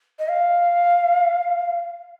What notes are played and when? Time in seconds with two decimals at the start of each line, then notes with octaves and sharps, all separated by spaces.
0.19 D#5
0.28 F5